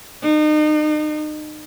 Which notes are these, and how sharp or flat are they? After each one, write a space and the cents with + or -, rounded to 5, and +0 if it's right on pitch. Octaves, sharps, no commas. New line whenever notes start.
D#4 -35